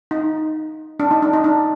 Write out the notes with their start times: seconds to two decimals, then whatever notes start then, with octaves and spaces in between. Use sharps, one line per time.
0.11 D#4
1.00 D4
1.11 D#4
1.22 D4
1.33 D#4
1.44 D4